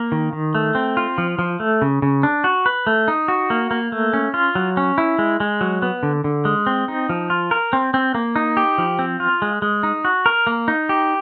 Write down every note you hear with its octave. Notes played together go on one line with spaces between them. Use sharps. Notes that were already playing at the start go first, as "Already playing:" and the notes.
Already playing: A#3
D#3
D#3
A3
C4
F4
F3
F3
A3
C#3
C#3
D4
F#4
B4
A3
D#4
F#4
A#3
A#3
A3
C#4
F4
F#3
C#4
E4
G#3
G#3
F#3
B3
D3
D3
G#3
C4
D#4
F3
F4
A#4
C4
C4
A#3
D#4
G4
F3
C4
F4
G#3
G#3
D#4
F#4
A#4
A#3
D#4
G4